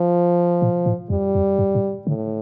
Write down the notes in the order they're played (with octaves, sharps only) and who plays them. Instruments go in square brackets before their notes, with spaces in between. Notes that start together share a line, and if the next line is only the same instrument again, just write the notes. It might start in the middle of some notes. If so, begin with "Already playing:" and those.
Already playing: [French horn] F3
[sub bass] A#2
A2
[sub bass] F2 [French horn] G3
[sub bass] F2
G2
A2
[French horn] A2 [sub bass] D3